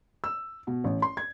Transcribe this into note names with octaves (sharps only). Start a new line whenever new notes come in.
E6
B2
A1
C6
G#6